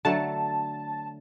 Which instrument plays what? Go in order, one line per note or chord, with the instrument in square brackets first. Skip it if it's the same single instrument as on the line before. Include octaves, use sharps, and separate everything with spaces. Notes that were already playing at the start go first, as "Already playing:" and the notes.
[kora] D3 F#3 A3 [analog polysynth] A5